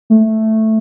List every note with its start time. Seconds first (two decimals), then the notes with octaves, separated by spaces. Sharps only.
0.10 A3